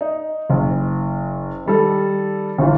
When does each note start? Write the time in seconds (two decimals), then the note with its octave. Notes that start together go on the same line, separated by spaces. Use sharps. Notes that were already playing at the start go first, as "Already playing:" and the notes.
0.01 D#4
0.50 F#1
1.66 D#3 G3 A4
2.58 G1 E3